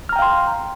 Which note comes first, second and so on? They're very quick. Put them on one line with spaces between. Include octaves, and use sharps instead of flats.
F6 A#5 G5 F5 C6